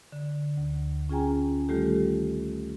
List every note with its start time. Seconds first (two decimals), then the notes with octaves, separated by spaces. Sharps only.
0.12 D3
0.57 D2
1.09 C#4 F4 G#4 G5 G#5 A#5
1.68 D#3 G3 A3 F4 G4 A4